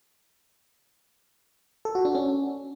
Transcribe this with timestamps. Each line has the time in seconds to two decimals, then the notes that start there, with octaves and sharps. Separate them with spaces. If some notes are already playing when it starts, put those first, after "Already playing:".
1.85 A4
1.95 F#4
2.05 D4
2.15 C#4